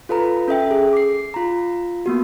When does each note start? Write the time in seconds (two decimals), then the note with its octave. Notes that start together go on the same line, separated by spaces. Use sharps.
0.09 F4 A4 B4 A#5
0.48 C#4 A4 E5 G5
0.71 G#4
0.93 D6 C7
1.34 F4 A#5
2.06 A#3 B3 F#4